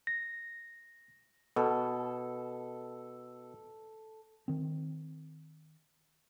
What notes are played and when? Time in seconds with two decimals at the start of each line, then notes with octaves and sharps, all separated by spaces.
0.07 A#6
1.56 B2 A4
4.48 D#3 C4